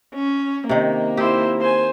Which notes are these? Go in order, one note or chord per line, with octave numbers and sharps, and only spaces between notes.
C#4
C3 D#3 A#3
E4 G4 C5
C5 G#5